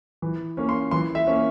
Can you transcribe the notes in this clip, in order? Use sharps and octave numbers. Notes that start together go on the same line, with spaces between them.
E3
A#3 C#4
C6
E3 C6
E5
A#3 C#4